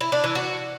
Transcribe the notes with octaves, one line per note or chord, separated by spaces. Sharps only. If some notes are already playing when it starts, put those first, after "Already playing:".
E4
D4
E3
F#4